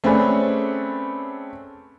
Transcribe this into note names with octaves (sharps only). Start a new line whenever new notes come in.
A3 C4 C#4 G#4 B4 D5